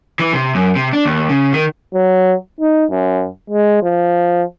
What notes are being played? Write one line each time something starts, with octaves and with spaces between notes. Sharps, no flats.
E3
C3
F#2
C3
D4
D#2
C#3
D#3
F#3
D#4
F#2
G#3
F3